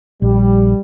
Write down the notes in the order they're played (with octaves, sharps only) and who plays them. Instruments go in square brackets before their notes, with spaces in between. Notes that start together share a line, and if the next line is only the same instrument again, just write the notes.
[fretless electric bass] A#1 [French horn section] G3